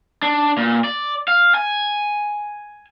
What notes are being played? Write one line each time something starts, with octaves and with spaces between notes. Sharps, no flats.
D4
A#2
D5
F5
G#5